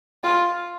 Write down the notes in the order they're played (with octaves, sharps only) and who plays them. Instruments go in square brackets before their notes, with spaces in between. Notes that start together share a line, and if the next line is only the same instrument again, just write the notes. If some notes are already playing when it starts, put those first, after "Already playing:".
[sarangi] F4